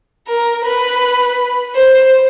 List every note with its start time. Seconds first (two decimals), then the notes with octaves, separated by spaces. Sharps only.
0.27 A#4
0.64 B4
1.75 C5